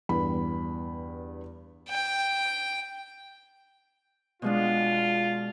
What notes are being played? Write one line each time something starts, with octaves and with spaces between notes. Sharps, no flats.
E2 G2 B5
G5
B2 G#3 D4 F4